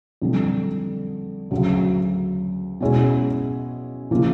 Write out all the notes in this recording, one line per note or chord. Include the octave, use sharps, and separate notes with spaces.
F2 D3 G3
D2 C#3 F#3
B2 G#3 C#4 E4 G#4
C#3 F3 A#3